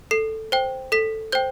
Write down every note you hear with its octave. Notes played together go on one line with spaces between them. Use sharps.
A4 C7
C5 G5
A4 B6
C5 G5 G6